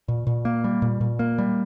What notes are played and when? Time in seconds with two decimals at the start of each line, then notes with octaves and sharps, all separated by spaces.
0.08 A#2
0.27 A#2
0.45 A#3
0.64 G3
0.82 A#2
1.01 A#2
1.19 A#3
1.38 G3